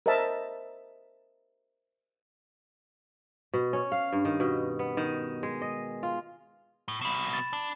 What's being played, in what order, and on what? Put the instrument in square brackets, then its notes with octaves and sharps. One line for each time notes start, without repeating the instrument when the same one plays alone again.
[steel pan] A#4 C5 D#5 E5 A5
[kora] B2
C#4
F5
G2
D#3
B2
B3
D#3
G#3
D#5
F4
[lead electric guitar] A2
[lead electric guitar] C2 B2 [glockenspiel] B5 E7
[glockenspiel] A6
[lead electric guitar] D4